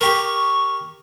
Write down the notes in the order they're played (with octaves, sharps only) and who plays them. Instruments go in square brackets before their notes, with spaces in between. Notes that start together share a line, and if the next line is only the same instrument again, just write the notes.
[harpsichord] G4 A#4 [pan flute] C#6